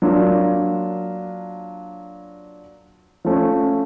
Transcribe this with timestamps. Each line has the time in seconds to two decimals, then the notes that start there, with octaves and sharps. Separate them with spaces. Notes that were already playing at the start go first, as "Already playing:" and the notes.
0.02 F#3 A#3 D4 F4
3.25 F3 A3 C#4